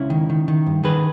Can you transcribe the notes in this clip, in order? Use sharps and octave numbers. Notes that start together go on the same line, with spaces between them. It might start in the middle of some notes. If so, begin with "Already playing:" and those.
Already playing: C#2 C#4 E4
D#3
D#3
D#3
G2
D#3 G#4 B4